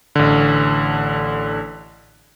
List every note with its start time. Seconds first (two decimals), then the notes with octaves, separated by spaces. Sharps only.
0.16 A1 D3